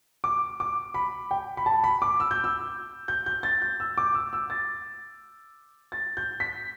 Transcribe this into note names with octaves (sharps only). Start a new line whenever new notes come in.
D6
D6
B5
G5
B5
A5
B5
D6
E6
G6
E6
G6
G6
A6
G6
E6
D6
E6
E6
A6
A6
G6
B6